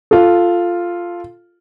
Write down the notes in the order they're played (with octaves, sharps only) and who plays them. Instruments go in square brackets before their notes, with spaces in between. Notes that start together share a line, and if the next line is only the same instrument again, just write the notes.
[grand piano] F4 A4